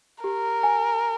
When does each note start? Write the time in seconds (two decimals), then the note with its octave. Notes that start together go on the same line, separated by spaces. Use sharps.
0.24 G4 A#4
0.63 G#5